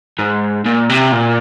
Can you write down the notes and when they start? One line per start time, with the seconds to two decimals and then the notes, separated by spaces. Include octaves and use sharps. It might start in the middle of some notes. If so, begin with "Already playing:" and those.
0.19 G#2
0.66 A#2
0.89 C3
1.12 A#2